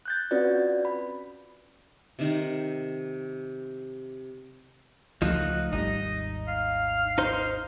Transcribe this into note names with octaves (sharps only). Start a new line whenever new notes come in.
F#6 G6 A6
C4 C#4 F4 F#4 B4 D5
B5
C3 D#3
C#2 F3 G#3 A3 D#4 F#4
G#1 D#2 G3 D#4 D#5
F5
D#4 C5